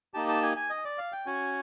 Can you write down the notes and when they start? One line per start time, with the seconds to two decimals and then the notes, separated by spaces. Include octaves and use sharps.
0.14 A#3 D#4 G4 A5
0.28 A5
0.42 G#5
0.56 G#5
0.70 D#5
0.85 D5
0.98 F5
1.12 G5
1.26 C#4 F#4 G#5